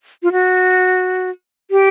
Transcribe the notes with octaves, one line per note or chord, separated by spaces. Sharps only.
F4
F#4
G4